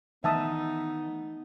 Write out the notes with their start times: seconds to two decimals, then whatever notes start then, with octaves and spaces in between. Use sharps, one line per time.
0.24 D#3 E3 A3 B3 D#4 E5 A5 D#6